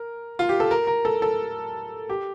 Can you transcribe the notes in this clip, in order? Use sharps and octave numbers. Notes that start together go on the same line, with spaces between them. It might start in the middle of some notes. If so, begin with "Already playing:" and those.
Already playing: A#4
F4
G4
A4
A#4
A#4
A4
A4
G4